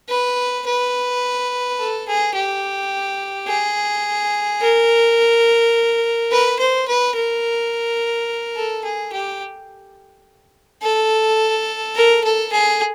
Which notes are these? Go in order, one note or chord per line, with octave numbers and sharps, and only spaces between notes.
B4
B4
A4
G#4
G4
G#4
A#4
B4
C5
B4
A#4
A4
G#4
G4
A4
A#4
A4
G#4